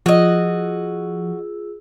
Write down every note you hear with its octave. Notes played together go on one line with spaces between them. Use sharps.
F3 F4 F#4 G#4 D#5 E6